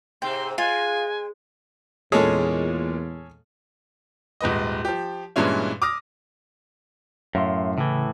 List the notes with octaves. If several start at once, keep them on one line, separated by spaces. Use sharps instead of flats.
G#2 C3 C4 G5 C6
G#3 F4 G#5
E2 A#2 G#3 C#4 G#4 A4 D#5
D#1 G#2 B4 D#5
F3 G4
G2 A#2 E3 G#3 C#4 E4
D6 D#6 F6 A#6
F#2 A2 E5 F5 C6
A2 C#3 E3